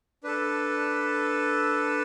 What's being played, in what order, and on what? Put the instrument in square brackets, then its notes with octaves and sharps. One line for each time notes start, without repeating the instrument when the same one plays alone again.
[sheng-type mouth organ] D4 A4 B4